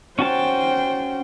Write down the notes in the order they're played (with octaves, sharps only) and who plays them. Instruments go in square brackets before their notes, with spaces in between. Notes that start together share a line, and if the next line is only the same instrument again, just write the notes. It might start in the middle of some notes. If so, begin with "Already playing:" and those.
[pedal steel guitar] C#4 F#4 A5 [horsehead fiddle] C5 G5